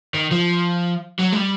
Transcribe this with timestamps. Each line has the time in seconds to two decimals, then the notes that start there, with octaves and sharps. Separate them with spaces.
0.14 D#3
0.32 F3
1.19 F#3
1.33 G#3
1.37 G3